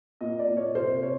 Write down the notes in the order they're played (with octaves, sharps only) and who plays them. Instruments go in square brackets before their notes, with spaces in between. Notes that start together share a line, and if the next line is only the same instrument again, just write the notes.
[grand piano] A#2 D#5
D5
A#2
C#5
C3 C5
C3 C#5